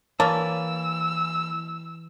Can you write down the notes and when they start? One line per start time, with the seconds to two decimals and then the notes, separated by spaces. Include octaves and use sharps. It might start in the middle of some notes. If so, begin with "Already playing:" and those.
0.20 E3 A#3 C#5 A5 E6